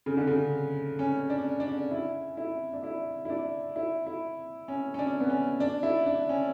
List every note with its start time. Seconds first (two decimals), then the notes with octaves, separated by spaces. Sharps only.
0.06 C#3
0.17 D3
0.27 C#3
0.99 C#4
1.30 D4
1.60 D4
1.91 E4
2.37 E4
2.73 D4
2.84 E4
3.25 E4
3.30 D4
3.76 E4
4.07 E4
4.68 C#4
4.94 C#4
4.99 D4
5.20 B3
5.30 C#4
5.60 D4
5.83 E4
6.06 D4
6.29 C#4